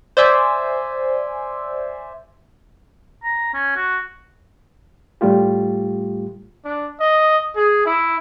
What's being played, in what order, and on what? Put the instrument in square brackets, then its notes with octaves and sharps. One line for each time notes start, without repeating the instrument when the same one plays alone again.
[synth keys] C5 D5 E5 G#5
[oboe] A#5
C#4
F#4
[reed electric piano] A2 G3 A3 F4 G4
[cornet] D4
D#5
G#4
E4